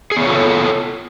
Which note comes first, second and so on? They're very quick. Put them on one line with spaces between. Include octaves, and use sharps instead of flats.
G#4 B3 C#5 F4 A4